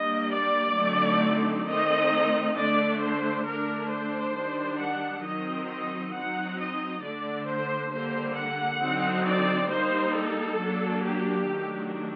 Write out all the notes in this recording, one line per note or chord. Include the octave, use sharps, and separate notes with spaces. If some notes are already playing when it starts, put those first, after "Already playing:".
Already playing: G3 A#3 D4 D#5
D5
D3 F#3 A3 C4 D#4
D#3 A3 C4 D#4 D#5
D3 A3 D4 D5
C5
D3 A3 D4 A#4
C5
D#3 G3 D4
F#5
D#3 F#3 C4 D#4 D#5
D#5
F#3 C4 D#4 F#5
D#5
D3 A3 D4 D5
C5
D3 G3 A#3 C5
F#5
D3 F#3 C4 D#4
D5
G3 A#3 D#4 C5
A4
F#3 A#3 D4
G4
D#3 F#3 A3 D4